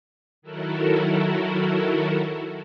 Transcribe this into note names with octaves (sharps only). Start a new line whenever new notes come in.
D#3 F#3 E4 F#4 A4 A#4